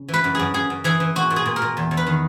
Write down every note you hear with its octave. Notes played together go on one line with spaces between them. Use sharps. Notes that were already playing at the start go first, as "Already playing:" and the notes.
Already playing: C#3
E3
B4
F#2
F#2 G#4
F#2 G#4
F#2
E3 G#4
E3
A#2 F#4
A#2
G#4
A#2
A#4
A#2
E2
E2
B4
D#3